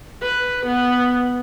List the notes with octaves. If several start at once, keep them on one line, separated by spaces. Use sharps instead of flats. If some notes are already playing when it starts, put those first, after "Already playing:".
B4
B3